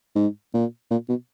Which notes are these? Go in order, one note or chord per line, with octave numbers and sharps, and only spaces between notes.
G#2
A#2
A#2
B2